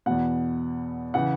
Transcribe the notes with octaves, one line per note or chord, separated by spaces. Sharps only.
E2 B2 F#5
C#3 E3 F#5